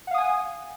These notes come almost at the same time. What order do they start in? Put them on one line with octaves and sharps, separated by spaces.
F#5 F5 D#6 G#5